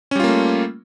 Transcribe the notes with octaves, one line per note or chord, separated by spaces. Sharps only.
G3 A3 A#3 C#4 F4